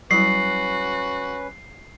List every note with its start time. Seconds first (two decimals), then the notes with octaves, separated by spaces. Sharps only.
0.11 F#3 G3 C#4 E4 F#4 B4 C7